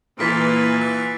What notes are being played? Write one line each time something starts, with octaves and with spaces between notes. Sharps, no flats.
A#2 E3 A#3 B4 A6 B6 D7
E3